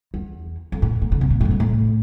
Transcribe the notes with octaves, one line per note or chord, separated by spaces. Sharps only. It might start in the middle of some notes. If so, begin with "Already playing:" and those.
E2
F2
A2
A#2
D3
C3
A#2
A2
F2
G2
A2